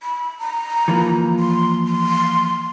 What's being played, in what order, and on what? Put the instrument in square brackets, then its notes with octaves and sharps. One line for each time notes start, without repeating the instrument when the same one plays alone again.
[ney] B5
A#5
[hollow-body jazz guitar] E3 F3 A#3
[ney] C6
C6